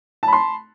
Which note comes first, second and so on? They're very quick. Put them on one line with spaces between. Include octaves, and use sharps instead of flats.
A5 B5 C6